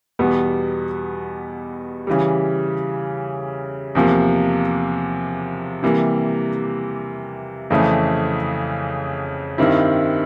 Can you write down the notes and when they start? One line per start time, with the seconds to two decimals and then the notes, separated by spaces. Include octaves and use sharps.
0.19 E2 B2 G3 B3
2.07 C#3 E3 G3
3.95 E2 C3 F3 A#3
5.83 C3 E3 G3 A#3
7.70 F2 C#3 E3 A3
9.58 G2 D#3 G3 C4 E4